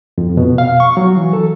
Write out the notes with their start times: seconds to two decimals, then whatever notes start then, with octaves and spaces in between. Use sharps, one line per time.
0.18 F2
0.37 B2
0.58 F5
0.80 C#6
0.97 F#3
1.16 E3
1.33 A4